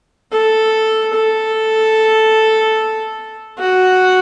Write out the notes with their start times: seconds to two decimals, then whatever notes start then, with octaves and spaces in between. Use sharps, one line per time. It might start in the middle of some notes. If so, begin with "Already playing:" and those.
0.32 A4
1.14 A4
3.60 F#4